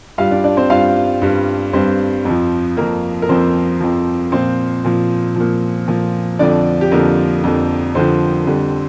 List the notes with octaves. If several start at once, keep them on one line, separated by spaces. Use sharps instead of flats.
G2 G3 F4 F5
D4 D5
D4 D5
C4 C5
G2 G3 F4 F5
G2 G3
G2 G3 C4 C5
F2 F3
F2 F3 A#3 A#4
A#4
F2 F3 C4 C5
F2 F3
A#2 F3 C4 C5
A#2 F3
A#2 F3
A#2 F3
F2 D3 F3 D4 D5
G4
F2 D3 F3 A#3 A#4
F2 D3 F3
F2 D3 F3 C4 C5
F2 D3 G3